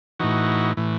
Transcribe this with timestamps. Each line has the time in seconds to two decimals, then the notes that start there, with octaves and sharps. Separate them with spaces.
0.20 A2 E3 D#4 F#4
0.77 A2 E3